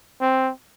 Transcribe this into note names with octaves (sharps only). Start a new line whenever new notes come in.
C4